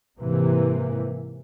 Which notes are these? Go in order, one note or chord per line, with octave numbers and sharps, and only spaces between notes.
G#2 C3 E3 A#3